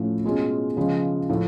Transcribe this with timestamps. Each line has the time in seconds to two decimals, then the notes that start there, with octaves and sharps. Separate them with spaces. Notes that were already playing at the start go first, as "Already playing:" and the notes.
Already playing: A2 F3 A3 C#4
0.24 B2 G#3 C#4 F4
0.77 C#3 F3 G#3 C#4
1.29 A2 F3 A3